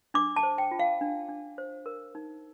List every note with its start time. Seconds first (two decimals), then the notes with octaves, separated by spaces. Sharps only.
0.14 D4 D6
0.36 A5
0.43 C5
0.58 G5
0.71 F4
0.79 F5
1.01 D4
1.29 D4
1.58 C5
1.86 A#4
2.15 D#4